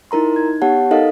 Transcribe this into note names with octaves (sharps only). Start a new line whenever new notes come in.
D#4 E4 A#4 A#5 C6
D#4 G#6
B3 G4 C#5 F#5 A5
D#4 A4 A#4 D#5 F5 A6